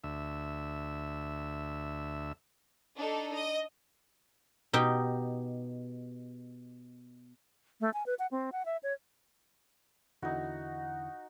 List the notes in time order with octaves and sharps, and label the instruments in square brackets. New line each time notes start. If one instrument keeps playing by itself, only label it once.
[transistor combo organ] D2 E5
[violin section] D4 D#4 A4
D#5
[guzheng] B2 D#4 G4 G5
[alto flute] A3
G#5
B4
F#5
C4
F#5
E5
C#5
[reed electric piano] E2 D3 E4 [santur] D#4 F#4